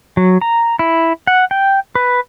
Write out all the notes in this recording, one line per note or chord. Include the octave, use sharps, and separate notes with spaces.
F#3
A#5
E4
F#5
G5
B4